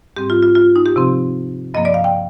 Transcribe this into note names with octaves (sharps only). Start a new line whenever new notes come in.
G#2 G3 C4 G4
F4
F4
F4
D#4
G4
C3 F3 C4
G2 F3 A#3 D#5
D5
F5
G5